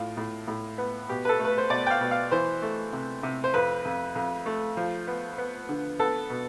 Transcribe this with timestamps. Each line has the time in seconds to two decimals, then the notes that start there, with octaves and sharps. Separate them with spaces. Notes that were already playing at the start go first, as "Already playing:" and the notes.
Already playing: A2 F4
0.17 A2
0.48 A2
0.78 B3
1.09 B2 G4
1.25 B4
1.29 A4
1.40 A3
1.45 B4
1.58 C5
1.70 B2 D5
1.86 G5
1.91 F5
2.01 B2
2.11 F5
2.31 E3 C5
2.62 A3
2.93 C3
3.23 C3
3.44 C5
3.54 F2 B4
3.85 F2
4.15 F2
4.46 A3
4.77 F3
5.07 B3
5.38 B3
5.69 D3
5.99 B3 A4
6.30 B2